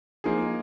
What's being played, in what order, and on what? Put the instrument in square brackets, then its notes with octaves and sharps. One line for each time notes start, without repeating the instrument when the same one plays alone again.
[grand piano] F3 A#3 D#4 G#4